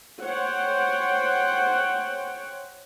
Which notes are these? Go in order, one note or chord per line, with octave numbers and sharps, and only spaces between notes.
C5 C#5 F#5 G5